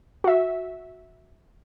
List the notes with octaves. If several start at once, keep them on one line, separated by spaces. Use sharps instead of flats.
F#4 E5